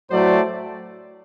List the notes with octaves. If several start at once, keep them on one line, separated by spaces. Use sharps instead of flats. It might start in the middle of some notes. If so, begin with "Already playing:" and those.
A2 F#3 A3 C5 D5